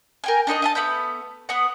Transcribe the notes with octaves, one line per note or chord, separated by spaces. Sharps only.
A#4 G5 G#5
D4 D#4 B4 D#5
D#5 E5 A5
A3 B3 B5 G6
B3 F#5